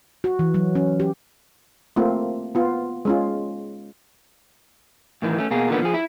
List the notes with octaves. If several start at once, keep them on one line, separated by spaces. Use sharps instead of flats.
F#4
E3
F#3
C#4
G4
A3 A#3 C4 F4
B3 F4
G#3 C#4 F4
A2 D#3 E3
A3 C#4
B2 A#3 G#4
A#2 D3 D#3 B3
F3 G#4
E4